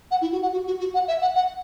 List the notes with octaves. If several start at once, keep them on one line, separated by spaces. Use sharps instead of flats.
F#5
E4
F#4
F#5
F#4
F#4
F#4
F#5
E5
F#5
F#5